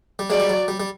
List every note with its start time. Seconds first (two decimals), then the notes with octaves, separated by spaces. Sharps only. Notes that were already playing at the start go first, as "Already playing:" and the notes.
0.19 G3
0.30 F#3 G#3 D5
0.40 G3
0.49 F#3
0.68 G3
0.80 G3